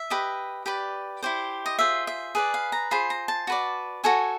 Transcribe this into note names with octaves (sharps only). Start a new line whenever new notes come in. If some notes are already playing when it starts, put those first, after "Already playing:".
Already playing: E5
G4 B4 D#5
G4 B4 D5
E4 G4 C5
D#5
F4 G#4 C5 E5
E5
G#4 B4 D5
F5
A#5
F4 G#4 C5 B5
A#5
A5
F#4 B4 D5
F#4 A4 C#5 G#5